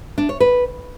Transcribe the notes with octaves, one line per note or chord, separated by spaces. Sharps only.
D4
C#5
B4